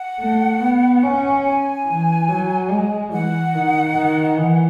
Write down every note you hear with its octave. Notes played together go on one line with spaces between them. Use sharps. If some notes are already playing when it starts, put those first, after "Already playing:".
Already playing: F#5
A3
B3
C#4
G#5
E3
F#3
G#3
E3 F#5
D#3
D#3
E3